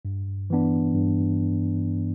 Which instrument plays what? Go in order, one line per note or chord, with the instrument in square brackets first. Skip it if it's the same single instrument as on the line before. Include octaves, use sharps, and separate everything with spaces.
[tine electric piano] G2
E3 B3 D4
G2